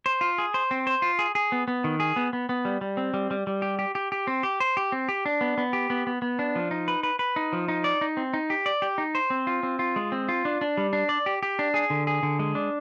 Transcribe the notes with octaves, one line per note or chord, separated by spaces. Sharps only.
C5
F4
G#4
C5
C4
C5
F4
G#4
G#4
B3
B3
D#3
G#4
B3
B3
B3
G3
G3
C4
G3
G3
G3
G4
G4
G4
G4
C4
G4
C5
G4
C4
G4
D4
B3
B3
G4
B3
B3
B3
D4
F3
D#4
B4
B4
B4
D#4
F3
D#4
D5
D#4
C4
D#4
G4
D5
G4
D#4
C5
C4
F4
C4
F4
G#3
C4
F4
D4
D4
G3
D4
D5
G4
G4
D4
G#4
D3
G#4
D3
G#3
D4